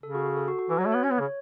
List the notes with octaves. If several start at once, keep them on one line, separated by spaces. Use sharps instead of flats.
C#3 A4
F#4
F#4
A4
F#4
F#4
E3 F#4
F#3 C#5
A3
C#5
B3
C#4 C#5
B3
C#3